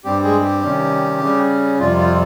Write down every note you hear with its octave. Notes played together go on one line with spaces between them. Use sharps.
G2 G3 C4 G4
G#3 G#4
G4
C3 D#3 G3 C#4
C#3 G3 C#4
F2 C3 G3 F4
F4